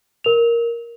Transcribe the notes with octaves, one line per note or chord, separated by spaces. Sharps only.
A#4 F7